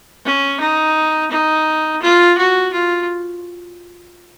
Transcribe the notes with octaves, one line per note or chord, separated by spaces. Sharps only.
C#4
D#4
D#4
F4
F#4
F4